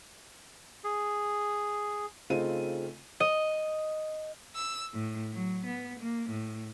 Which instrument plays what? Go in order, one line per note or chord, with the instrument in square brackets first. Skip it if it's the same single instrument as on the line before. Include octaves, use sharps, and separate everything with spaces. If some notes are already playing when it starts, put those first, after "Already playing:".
[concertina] G#4
[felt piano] C#3 A3 C4 D#4 F4 D#7
[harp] D#5
[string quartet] E6
A2
F#3
B3
A#3
A2